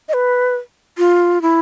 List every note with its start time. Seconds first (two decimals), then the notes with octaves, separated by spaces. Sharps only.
0.09 D#5
0.13 B4
0.98 F4
1.42 E4